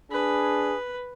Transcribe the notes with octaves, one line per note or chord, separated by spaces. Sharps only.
D4 G#4 B4